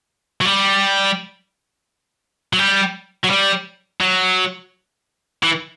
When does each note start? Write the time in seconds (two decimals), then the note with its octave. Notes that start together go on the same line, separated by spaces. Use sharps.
0.41 F#3
0.45 G3
2.53 F#3
2.59 G3
3.24 F#3
3.30 G3
4.01 F#3
5.43 E3